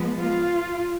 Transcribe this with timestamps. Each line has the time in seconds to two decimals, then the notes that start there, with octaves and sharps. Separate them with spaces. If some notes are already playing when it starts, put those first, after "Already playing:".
Already playing: F3 G#3 B3
0.20 F4